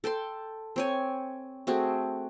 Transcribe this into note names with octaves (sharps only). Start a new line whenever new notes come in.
A4 G5 A5 C6
C4 C#5 G#5
A3 C4 F#4 G#4